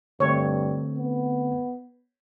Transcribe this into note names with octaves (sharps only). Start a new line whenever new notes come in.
G2 D3 A3 C4 C#5
B3